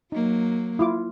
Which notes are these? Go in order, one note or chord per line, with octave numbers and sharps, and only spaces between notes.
F#3 A#3 D#4
E4 F4 D6